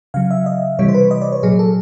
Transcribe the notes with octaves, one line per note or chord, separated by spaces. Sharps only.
C#3 F#3 F5
E5
D#5
C3 E3 G3 C#5
C5
B4
D#5
D5
C#5
A#2 F#3 G#4
A4